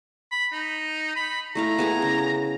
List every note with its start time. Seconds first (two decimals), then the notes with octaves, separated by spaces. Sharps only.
0.31 B5
0.52 D#4
1.16 B5
1.55 A3 E4 F5 A#5
1.79 B3 G#4 A5
2.02 C#3